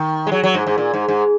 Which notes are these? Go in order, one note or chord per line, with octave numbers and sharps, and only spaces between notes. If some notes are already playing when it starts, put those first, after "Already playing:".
Already playing: D#3
G#3
F#3
F#3
G#2
G#2
A#2
G#2
G#2